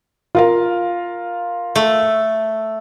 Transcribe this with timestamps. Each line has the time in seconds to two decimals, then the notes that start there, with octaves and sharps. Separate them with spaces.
0.35 F4 A#4 F5
1.75 A3